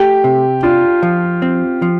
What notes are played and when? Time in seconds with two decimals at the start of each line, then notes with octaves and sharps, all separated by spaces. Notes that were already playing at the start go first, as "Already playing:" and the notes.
Already playing: A3 G4
0.24 C3
0.63 D4 F4
1.03 F3
1.42 C4
1.82 F3